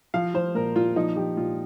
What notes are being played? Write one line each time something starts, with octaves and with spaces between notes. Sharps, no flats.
F3 F5
F3 C5
A#2 A#4
A#2 F4
F3 D#4
F3 G4
A#2 F4